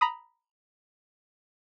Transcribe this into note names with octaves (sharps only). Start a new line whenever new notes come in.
A#5 B5 D#6